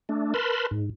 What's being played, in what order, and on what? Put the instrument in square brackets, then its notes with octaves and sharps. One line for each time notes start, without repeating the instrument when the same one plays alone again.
[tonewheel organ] A3 D4
A#4 B4 A5 B5 C6
G#2